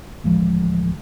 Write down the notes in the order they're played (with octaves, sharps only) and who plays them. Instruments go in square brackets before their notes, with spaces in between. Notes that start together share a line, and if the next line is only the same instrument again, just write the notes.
[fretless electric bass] A1 D2 F3 G#3